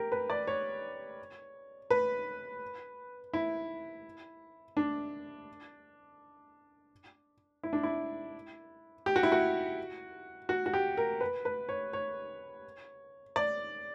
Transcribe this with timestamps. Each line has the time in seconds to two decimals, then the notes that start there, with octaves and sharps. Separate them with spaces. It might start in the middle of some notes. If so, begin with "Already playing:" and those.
Already playing: G4 A#4
0.12 B4
0.30 D5
0.47 C#5
1.90 B4
3.34 E4
4.77 D4
7.63 E4
7.73 D4
7.83 E4
9.06 G4
9.16 F#4
9.23 E4
9.32 F#4
10.49 F#4
10.66 F#4
10.74 G4
10.97 A#4
11.21 B4
11.45 B4
11.69 C#5
11.93 C#5
13.36 D5